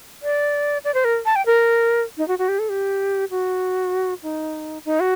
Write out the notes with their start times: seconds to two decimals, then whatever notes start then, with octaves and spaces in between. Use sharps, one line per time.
0.23 D5
0.84 D5
0.94 C5
1.05 A#4
1.26 A5
1.36 G5
1.46 A#4
2.17 D#4
2.28 F#4
2.39 F#4
2.48 G4
2.59 A4
2.69 G4
3.31 F#4
4.23 D#4
4.85 D#4
5.00 F#4